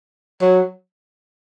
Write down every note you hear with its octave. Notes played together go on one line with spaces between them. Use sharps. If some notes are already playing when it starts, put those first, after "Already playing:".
F#3